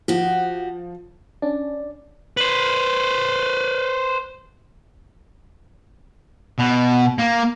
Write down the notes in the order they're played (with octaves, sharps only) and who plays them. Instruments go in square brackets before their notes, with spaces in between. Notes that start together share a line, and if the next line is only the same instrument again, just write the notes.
[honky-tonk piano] F3 [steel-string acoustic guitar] F#4 G4
[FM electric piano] C#4 D4 [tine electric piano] D5
[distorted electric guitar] B4 C5
B2
A#3